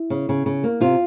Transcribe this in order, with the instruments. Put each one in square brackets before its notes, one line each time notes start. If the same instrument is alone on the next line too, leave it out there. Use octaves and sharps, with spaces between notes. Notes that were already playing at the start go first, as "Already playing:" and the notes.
Already playing: [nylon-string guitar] E4
C#3
C#3
C#3
A#3
C3 F4